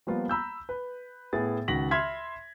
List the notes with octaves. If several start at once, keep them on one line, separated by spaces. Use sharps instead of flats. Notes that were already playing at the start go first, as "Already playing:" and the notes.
F3 G3 A#3 B3 F4
A#5 B5 E6 G6
B4
A2 B3 G#4 A6
C#2 D#3 F#4 A#6 B6 F#7
E5 B5 C6 F6 G#6 B6